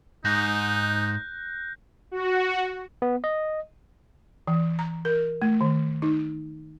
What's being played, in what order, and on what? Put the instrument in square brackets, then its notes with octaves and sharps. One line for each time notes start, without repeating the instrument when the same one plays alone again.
[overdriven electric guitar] G#2 [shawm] D#4 [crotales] F#6 G6 A#6
[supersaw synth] F#4
[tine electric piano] B3
D#5
[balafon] E3
A#5
A#4
A3
D#3
D#4